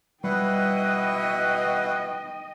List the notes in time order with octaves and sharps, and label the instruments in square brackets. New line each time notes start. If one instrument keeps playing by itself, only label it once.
[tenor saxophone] B2 [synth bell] G3 [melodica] E4 B4 F#5 [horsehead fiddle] D#5 G5